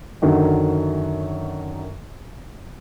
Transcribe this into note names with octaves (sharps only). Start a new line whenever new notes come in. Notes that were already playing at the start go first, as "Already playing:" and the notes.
F#2 D3 D#3 F#3